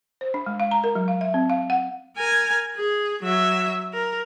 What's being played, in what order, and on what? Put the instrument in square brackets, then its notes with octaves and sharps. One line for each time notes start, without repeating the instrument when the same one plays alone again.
[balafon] C5
D4
G#3
F5
A#5
A#4
F#3
F5
E5
C4
F5
F#5
[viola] A#4 G#5
G#4
F#3 E5
A#4